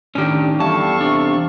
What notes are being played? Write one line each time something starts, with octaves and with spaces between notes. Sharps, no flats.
A2 D#3 C#4 D4 G4
E2 G3 A4 F5 A5 C#6
C3 D4